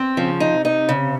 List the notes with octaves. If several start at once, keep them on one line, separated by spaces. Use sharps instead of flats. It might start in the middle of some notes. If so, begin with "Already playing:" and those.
Already playing: C4
C#3 F3
D#4
C3 D#4
C#3